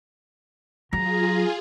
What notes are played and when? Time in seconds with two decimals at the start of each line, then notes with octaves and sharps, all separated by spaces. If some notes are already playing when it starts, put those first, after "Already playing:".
0.93 F#3 F4 G#4 A#5